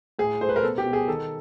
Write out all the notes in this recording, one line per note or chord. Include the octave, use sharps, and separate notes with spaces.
A2 G#4
A3 C5
B4
A#4
B2 A4
G4
B2
G#4
D#3 A4